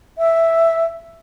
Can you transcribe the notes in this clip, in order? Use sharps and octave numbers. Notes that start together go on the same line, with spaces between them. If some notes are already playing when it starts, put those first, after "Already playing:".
E5